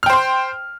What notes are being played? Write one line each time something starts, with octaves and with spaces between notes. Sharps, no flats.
C5 G5 C6 F6